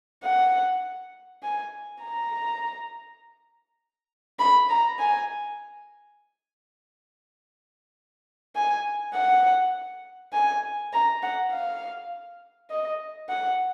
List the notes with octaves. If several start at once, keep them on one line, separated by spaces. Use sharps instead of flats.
F#5
G#5
A#5
B5
A#5
G#5
G#5
F#5
G#5
A#5
F#5
F5
D#5
F#5